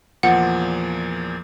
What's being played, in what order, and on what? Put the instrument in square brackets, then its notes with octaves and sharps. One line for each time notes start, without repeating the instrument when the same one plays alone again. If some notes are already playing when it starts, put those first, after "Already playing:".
[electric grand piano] E2 A#2 F3 [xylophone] F#5